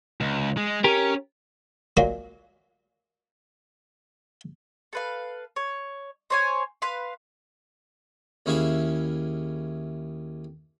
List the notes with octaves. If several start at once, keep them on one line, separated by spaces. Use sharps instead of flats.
C#2
G#3
C#4 G4 A#4
A#2 F#3 G#3 A#3
A4 B4 F5
C#5
C5 C#5 G#5
B4 F5 C6
D#2 C#4 E4 G#4 E5 F5